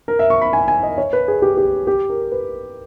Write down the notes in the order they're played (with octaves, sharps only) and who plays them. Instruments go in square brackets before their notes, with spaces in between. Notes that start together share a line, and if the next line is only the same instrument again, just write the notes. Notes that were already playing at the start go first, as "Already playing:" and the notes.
[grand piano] A#4
E5
C#6
B5
G#5
G#5
D#5
C#5
B4
G#4
G4
G4
G4
A#4
B4